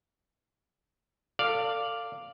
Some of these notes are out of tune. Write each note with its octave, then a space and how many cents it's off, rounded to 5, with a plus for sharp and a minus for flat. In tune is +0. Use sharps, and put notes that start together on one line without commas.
A4 +35 D5 +0 F5 +0